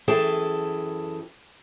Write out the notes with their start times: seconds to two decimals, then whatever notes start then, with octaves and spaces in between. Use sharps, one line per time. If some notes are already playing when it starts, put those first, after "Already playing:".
0.08 F#2 E3 G#4 A4 G5 A5